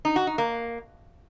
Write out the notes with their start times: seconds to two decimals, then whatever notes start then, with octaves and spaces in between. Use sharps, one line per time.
0.05 D#4
0.16 F#4
0.27 D#4
0.38 A#3